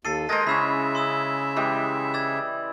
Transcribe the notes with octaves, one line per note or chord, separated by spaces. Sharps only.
D#2 A4 A6 C7 D#7
G#3 A#4 C5 D#5 G#6 A#6
C#3 C#4 E4 E5 B5 E6
C6 D#6 E6
E3 G#3 G4
D5 E6 G#6